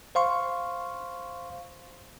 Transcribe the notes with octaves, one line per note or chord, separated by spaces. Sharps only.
C5 F5 C6 C#6